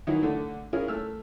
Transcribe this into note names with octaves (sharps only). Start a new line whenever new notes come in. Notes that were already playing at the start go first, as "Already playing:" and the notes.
D#3 E3 F#3 D#4 E4
D3 A3
C#4 E4 F4 G#4 A#4
A3 E6 F6